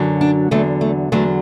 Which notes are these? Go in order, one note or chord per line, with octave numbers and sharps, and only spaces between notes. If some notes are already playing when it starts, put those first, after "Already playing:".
Already playing: F#2 D3 F#3
D4
E2 D3 F#3 A3
A3
E2 D3 F#3 A3